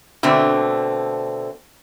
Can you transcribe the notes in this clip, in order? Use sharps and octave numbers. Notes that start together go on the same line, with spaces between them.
B2 D3 A3 C4 D4